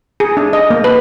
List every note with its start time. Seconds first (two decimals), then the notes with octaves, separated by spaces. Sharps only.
0.20 G#4
0.37 D4
0.53 D#5
0.70 A#3
0.84 B4